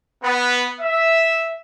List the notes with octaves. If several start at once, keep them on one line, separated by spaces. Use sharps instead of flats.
B3
E5